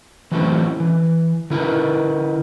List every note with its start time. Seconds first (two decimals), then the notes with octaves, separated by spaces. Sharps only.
0.31 E3 F#3 A3 C4 C#4 E4
0.80 E3
1.50 D3 E4 A#4 B4